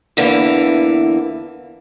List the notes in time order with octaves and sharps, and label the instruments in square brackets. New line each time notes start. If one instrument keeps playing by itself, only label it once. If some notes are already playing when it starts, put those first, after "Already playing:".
[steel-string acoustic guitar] E2 D3 E3 A#3